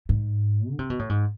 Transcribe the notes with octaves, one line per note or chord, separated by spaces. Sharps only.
G#2
D3
C3
B2
A2
G#2